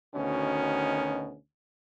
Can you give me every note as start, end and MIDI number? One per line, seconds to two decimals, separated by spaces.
0.15 1.35 38
0.15 1.35 47
0.15 1.35 51
0.15 1.35 61